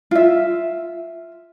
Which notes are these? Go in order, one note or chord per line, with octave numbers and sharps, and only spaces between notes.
F4 E5